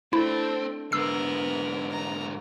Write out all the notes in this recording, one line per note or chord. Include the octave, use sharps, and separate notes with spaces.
A3 C4 D4 E4
G#2 D3 B3 A#4 E6 C7
A#5